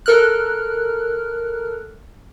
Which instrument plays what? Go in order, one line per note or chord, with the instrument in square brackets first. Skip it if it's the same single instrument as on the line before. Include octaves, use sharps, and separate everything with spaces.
[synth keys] A4 A#4 F6 F#6